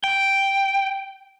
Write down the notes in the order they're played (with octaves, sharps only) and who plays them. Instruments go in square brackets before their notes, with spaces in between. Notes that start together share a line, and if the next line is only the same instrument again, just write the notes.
[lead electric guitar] G5